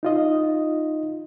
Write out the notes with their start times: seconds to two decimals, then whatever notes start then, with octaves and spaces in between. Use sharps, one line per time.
0.03 D#4 F4 D#5